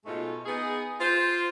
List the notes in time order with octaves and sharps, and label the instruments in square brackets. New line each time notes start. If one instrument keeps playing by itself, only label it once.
[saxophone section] G#2 B2 G#3 A3 D#4 F4
B3 D#4 G#4
F4 C5